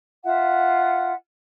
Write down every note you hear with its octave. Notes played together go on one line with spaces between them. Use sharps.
F4 E5 F#5